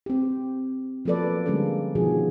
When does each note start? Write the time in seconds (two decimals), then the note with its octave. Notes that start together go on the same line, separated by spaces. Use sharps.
0.06 C4 G4
1.05 F3 F#3 A#3 A4 B4 D5
1.46 D3 G3 G#3 A#3 C#4 A4
1.95 B2 D#3 F3 D4 F#4 G#4